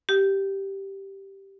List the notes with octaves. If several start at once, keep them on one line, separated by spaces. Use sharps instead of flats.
G4